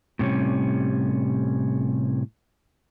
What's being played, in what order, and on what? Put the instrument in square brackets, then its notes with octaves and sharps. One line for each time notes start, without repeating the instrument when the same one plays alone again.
[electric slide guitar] A2 C3 G3 C#4